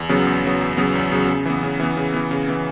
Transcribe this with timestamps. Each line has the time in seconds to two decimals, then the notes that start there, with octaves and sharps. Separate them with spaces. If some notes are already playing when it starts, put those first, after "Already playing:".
Already playing: E2
0.09 C#3 F#3 B3
0.27 E2
0.43 C#3 F#3 B3
0.61 E2
0.77 C#3 F#3 B3
0.95 E2
1.12 C#3 F#3 B3
1.29 C#3
1.45 E3 B3
1.63 C#3
1.80 E3 B3
1.97 C#3
2.14 E3 B3
2.31 C#3
2.48 E3 B3